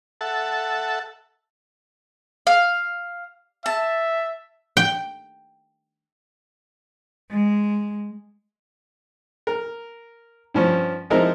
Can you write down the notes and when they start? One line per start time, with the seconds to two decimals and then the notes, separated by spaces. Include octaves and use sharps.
0.21 A4 E5 F#5 A5
2.47 F5
3.66 E5 A5
4.77 G5
7.31 G#3
9.47 A#4
10.54 G2 F3 C#4
11.10 F3 G#3 C4 D#4 E4 A#4